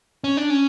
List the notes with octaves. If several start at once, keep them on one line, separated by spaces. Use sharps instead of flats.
C#4
D4
C#4